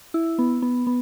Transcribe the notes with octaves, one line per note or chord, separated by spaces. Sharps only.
E4
B3
B3
B3